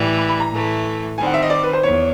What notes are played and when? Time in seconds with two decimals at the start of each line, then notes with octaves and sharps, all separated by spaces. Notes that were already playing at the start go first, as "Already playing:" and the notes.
Already playing: A2 E3 G3
0.18 B5
0.29 B5
0.40 A#5
0.51 A2 E3 A3
1.18 D#3 G3 C4 G#5
1.26 F#5
1.34 E5
1.43 D#5
1.50 D5
1.63 B4
1.73 C5
1.83 E2 C#5